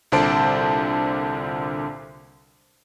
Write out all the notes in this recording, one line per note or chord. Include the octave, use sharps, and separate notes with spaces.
C2 A#2 D3 C5 A5 D7